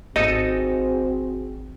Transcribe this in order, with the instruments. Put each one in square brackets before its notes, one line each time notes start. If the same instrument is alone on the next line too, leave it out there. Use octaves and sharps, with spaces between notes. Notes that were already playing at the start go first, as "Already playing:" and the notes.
[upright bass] G#1 [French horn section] C4 F#4 G#4 [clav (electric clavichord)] D#4 A4 [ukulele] D#5